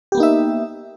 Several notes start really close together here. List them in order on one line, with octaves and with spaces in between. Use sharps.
G4 B3 A#3 D#4 E5